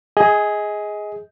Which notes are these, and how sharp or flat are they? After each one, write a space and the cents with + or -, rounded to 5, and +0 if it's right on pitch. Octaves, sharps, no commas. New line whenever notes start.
G#4 +0 D#5 +25